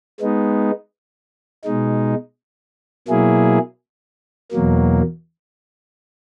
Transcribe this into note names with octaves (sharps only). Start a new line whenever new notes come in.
G#3 B3 D#4
B2 G#3 D#4
B2 F#3 A#3 E4 G#4
E2 B2 F#3 A#3